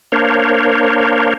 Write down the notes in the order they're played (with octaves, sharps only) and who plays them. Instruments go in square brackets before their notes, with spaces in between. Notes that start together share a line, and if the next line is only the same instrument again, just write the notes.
[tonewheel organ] A#3 D4 A#4 C5 C#5